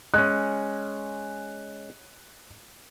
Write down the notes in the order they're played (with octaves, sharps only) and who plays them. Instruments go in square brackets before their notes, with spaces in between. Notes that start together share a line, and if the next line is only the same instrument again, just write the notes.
[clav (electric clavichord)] G#3 C#4 [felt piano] F#6